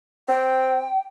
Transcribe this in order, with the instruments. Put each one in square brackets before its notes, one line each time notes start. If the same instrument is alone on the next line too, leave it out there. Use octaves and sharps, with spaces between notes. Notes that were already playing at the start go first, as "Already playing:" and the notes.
[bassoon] C4 [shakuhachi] G5